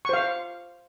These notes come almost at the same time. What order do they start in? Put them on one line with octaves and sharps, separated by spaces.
C#6 C5 F5